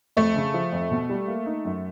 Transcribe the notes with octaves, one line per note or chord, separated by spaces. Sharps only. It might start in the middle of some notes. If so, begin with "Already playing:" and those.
F2 A3
C#3
F3
F2
B2
G3
A#3
D#4
F#2